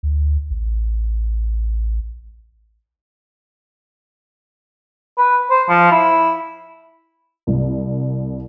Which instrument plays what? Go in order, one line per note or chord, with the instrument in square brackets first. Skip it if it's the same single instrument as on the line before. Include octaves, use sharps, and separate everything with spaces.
[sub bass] D2
A1
[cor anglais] B4
C5
F3
E4
[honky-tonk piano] C2